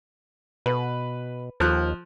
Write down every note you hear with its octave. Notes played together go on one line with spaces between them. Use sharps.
B2 B4
D#2 F3 F#6